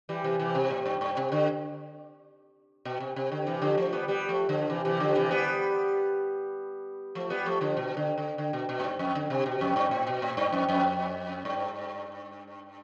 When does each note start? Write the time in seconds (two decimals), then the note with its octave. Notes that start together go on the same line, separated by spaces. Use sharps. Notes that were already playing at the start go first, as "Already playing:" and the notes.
0.09 E3 G3
0.24 C3 E3
0.39 C3 E3
0.55 C3
0.70 A2
0.86 G2
1.01 G2
1.17 C3
1.32 D3
2.85 B2
3.00 C3
3.16 C3
3.32 D3
3.47 C3 E3
3.62 D3 F3
3.77 F3 A3
3.93 G3 B3
4.08 G3 B3
4.29 F3 A3
4.49 D3 F3
4.70 C3 E3
4.85 C3 E3
5.00 D3 F3
5.15 C3 E3
5.31 G3 B3
7.15 F3 A3
7.30 G3 B3
7.46 F3 A3
7.61 D3 F3
7.77 B2
7.97 D3
8.18 D3
8.38 D3
8.53 B2
8.69 B2
8.80 A2
8.84 G2
8.99 F2
9.15 D3
9.30 C3
9.46 B2
9.61 F2
9.76 G2
9.91 A2
10.07 B2
10.22 A2
10.37 G2
10.52 F2
10.68 F2
11.45 G2